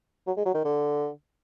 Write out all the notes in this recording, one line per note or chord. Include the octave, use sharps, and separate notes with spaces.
F#3
G#3
F#3
D#3
D3